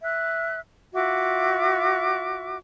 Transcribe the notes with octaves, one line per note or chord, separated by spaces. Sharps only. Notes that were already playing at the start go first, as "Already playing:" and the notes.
E5 F#6
F4 F#4 E5 D6